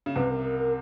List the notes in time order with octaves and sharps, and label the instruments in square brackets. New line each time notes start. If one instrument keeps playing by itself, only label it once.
[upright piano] C#3
[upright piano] C2 C3 [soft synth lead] B4
[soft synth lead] A#4
A#4
A#4